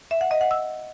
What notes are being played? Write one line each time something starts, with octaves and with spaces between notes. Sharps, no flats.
E5
F#5
D#5
F#5
E6